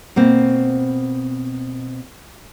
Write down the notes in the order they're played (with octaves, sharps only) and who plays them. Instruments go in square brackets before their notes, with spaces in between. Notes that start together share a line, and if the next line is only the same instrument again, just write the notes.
[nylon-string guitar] B2 A#3 C4